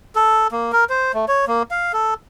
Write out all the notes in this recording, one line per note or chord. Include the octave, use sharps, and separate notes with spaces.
A4
A#3
A#4
C5
A3
C#5
A#3
F5
A4